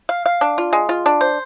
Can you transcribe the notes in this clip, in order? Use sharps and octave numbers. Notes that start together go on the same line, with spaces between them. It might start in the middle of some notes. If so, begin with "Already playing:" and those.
F5
F5
D4
F4
G#3
F4
D4
C5